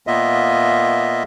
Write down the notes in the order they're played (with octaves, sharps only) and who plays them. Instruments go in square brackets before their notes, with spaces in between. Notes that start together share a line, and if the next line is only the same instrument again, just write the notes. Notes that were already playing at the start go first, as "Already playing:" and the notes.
[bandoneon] A#2 A#3 B3 F4 D#5 E5